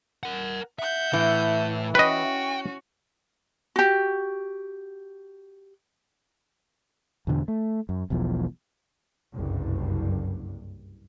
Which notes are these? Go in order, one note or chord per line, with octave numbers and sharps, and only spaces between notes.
A#4 F#5
E5 F#5 G6
A2 E3
C#4 F#4 B4 D#5 G5
F#4 G4
E2 B2 D3
A3
F#2
E1 B1 E2 F3
F#1 C2 G2